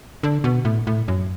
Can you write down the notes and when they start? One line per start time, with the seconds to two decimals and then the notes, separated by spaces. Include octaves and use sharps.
0.23 D3
0.44 B2
0.65 A2
0.87 A2
1.08 F#2